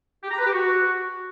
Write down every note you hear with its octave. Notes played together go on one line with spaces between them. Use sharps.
G4
A#5
B4
G4
F#4